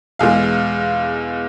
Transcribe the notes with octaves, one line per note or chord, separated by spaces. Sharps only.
E2 B2 G#3 F5